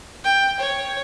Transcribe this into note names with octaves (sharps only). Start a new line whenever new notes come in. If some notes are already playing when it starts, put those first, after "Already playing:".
G5
C#5